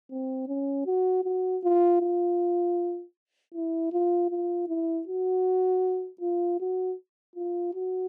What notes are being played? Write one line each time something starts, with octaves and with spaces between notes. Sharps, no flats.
C4
C#4
F#4
F#4
F4
F4
E4
F4
F4
E4
F#4
F4
F#4
F4
F#4